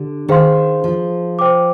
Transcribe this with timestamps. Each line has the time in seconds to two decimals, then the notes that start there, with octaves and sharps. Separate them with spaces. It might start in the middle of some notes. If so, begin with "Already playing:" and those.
Already playing: D3 D4 G4
0.28 D#3 G#4 C5 F5 C6
0.84 F3
1.39 C5 G5 D6